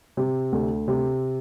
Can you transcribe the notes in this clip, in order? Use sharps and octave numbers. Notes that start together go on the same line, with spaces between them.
C3
D2
C3